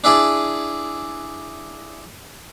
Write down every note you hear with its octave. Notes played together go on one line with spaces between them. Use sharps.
D4 E4 G#4 D5